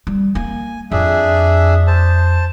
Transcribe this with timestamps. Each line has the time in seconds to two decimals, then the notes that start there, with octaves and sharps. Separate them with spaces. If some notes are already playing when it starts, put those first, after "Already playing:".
0.07 G3
0.35 A#3 G#5
0.92 F2 D4 G#4 E5
1.87 C5 A5